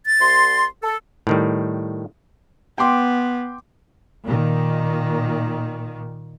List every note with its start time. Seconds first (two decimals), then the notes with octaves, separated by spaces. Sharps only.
0.06 A6
0.20 C2 C6
0.83 A4
1.27 A2 D#3 G3
2.78 B3 G5 C6 D6
4.25 A#2 D#3